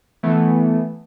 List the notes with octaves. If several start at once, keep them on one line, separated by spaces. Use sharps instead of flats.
E3 A3 B3